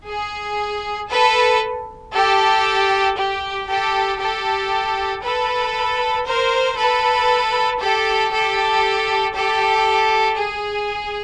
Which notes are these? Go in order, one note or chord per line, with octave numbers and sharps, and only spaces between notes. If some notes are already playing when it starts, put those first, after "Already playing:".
G#4
A4 B4
G4 A4
G4
G4 A4
G4 A4
A4 B4
A#4 C5
A4 B4
G4 A4
G4 A4
G4 A4
G#4